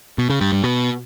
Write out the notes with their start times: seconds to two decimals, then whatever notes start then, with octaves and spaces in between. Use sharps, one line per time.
0.18 B2
0.30 C#3
0.41 G2
0.52 G2
0.64 B2